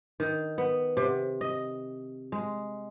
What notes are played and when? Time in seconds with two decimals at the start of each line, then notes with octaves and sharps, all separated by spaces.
0.20 D#3
0.58 B3
0.97 C3
1.41 D#5
2.32 G#3